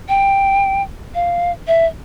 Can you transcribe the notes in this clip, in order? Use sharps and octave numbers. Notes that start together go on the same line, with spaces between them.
G5
F5
E5